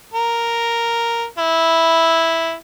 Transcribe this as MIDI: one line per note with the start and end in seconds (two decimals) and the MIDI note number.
0.14 1.25 70
1.38 2.54 64